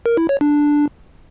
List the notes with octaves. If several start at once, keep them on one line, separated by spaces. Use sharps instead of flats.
A#4
E4
C#5
D4